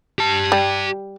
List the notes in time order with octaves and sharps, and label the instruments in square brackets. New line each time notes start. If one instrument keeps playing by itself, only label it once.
[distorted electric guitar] G4 A5
[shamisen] G3